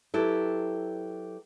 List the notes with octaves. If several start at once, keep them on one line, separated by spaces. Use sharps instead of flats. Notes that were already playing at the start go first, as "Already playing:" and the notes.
F#3 E4 G4 A4 B4